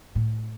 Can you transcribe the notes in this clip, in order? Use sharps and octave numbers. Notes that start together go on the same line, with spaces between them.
A2